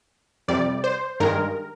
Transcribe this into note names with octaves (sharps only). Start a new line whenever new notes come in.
F2 C3 G3 D5
C5
G2 D#3 G#3 A#4